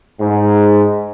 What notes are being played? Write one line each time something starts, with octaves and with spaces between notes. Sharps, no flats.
G#2